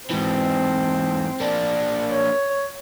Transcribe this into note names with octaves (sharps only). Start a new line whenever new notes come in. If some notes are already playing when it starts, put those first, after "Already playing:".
G#2 E3 C4
A#3 D4
C#5